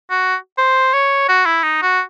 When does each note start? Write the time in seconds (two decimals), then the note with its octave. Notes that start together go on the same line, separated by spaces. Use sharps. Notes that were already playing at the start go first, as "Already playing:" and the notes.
0.11 F#4
0.58 C5
0.94 C#5
1.29 F#4
1.46 E4
1.63 D#4
1.82 F#4